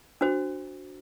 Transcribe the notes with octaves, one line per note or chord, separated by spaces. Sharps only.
D4 F#4 C5